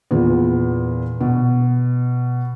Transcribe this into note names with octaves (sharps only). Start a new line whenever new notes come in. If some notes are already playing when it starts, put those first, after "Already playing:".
E2 A#2 B3
B2